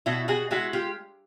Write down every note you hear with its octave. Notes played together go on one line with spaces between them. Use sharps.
B2 E4 F#4
F#4 G#4
G#3 E4 F#4
F4 G4